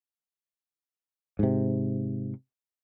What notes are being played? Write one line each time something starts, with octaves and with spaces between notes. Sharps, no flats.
G#2 C3